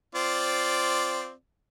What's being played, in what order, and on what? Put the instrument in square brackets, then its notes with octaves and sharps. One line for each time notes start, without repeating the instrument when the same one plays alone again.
[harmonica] C4 F4 D5